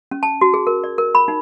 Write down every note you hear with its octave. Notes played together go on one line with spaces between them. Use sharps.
C#4
A5
F#4
G#4
A#4
D5
A#4
B5
D#4